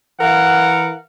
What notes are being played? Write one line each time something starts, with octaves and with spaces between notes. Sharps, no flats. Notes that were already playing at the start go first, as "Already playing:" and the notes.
E3 A#4 F5 F#5